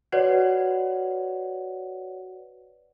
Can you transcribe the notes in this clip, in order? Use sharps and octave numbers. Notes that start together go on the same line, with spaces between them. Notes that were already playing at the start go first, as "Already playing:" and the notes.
F#4 B4 C#5 D5 F#5